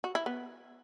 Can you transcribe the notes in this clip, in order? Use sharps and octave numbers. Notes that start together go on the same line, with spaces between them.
F#4
E4
B3